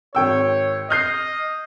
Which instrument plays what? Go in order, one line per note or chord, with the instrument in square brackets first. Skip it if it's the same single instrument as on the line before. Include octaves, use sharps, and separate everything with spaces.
[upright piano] G#1 G5 E6 [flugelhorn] C#5
[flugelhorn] D#5 [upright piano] F6 G6 C7